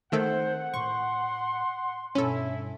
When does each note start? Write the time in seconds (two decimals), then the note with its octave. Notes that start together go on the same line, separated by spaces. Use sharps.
0.12 D#3 A3 C4 A4 C5 F#5
0.74 A2 C6 C#6
2.15 G2 B2 C#4 E4 A4